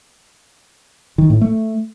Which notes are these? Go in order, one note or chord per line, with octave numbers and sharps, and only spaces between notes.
D#3
A2
A3